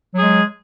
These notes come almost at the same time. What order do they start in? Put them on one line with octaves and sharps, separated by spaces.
F#3 G#4 G#3